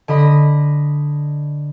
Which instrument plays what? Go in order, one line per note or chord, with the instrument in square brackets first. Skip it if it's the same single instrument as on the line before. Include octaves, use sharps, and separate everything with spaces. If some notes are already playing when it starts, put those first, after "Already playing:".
[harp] D3 D#5 B5 D#6